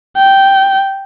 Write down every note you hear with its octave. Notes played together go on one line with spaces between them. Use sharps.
G5